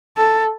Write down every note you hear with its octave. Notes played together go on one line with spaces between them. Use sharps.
A4